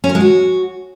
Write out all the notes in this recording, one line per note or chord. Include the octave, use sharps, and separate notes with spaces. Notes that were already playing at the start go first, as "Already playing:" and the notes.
C#4
A#4
G#3
F#4